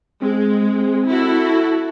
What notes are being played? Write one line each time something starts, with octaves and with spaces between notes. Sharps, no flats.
G#3 C4
E4 F#4 A4